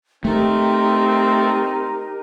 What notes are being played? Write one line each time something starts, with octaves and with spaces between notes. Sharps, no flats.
A3 C4 D#4 G4 A#4